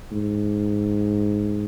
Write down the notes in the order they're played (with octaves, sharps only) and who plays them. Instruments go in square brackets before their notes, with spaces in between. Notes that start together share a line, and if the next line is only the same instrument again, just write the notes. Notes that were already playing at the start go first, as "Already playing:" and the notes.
[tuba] G#2